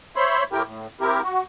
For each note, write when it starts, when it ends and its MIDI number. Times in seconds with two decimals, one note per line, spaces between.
0.16 0.44 72
0.16 0.44 73
0.16 0.44 76
0.16 0.44 83
0.16 0.44 84
0.52 0.63 45
0.52 0.63 57
0.52 0.63 64
0.52 0.63 67
0.52 0.63 70
0.52 0.63 79
0.66 0.87 45
1.00 1.21 60
1.00 1.21 64
1.00 1.21 67
1.00 1.21 70
1.23 1.43 66